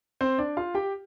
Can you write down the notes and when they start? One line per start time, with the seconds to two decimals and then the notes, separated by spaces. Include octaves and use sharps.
0.21 C4 C5
0.38 D4 D5
0.57 F4 F5
0.75 G4 G5